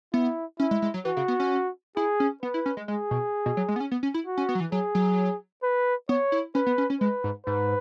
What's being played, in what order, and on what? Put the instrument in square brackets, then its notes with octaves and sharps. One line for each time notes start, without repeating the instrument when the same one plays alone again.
[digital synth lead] B3 [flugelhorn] E4
[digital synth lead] C#4 [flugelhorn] E4
[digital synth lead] G#3
G#3
F#3
[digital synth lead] E3 [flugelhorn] F#4
[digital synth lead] C#3
B3
C#4
[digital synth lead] E4 [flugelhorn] G#4
[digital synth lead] C#4
[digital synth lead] B3 [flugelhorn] B4
[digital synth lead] E4
C#4
G#3
[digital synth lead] G#3 [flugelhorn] G#4
[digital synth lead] B2
B2
F#3
G#3
B3
C#4
B3
C#4
E4
[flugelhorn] F#4
[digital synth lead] C#4
B3
F#3
E3
[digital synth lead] F#3 [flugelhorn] G#4
[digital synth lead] F#3
[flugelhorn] B4
[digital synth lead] B3 [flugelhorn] C#5
[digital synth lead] E4
[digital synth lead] C#4 [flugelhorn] B4
[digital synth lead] B3
C#4
C#4
[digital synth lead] G#3 [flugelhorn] B4
[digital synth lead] G#2
[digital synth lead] G#2 [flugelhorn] B4